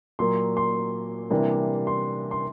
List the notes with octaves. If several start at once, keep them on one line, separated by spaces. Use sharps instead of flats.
A#2 F#3 A#3 C6
C6
C3 E3 G3 A#3 D4
C6
C6